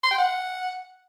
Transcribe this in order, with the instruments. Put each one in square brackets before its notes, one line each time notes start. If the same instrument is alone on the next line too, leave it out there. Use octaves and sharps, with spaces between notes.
[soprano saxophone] C6
G5
F#5